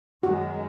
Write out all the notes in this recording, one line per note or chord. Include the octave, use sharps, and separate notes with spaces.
F#2 D#3 G#3 F#4